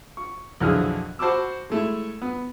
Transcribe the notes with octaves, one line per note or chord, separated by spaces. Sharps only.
C#6
B1 F2 D3 E3 G#4 F6
F#4 C5 A5 B5 D6 E6
G#3 A3 E4
B3